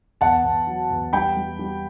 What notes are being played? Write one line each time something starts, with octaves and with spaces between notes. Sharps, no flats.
E2 F#5 A5
E2
F#3
E2
G3 G5 B5
G3
G3